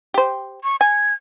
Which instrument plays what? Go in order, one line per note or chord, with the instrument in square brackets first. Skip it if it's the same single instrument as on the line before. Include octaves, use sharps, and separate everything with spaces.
[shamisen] G4 C5
[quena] C#6
[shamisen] G#5 [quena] G#6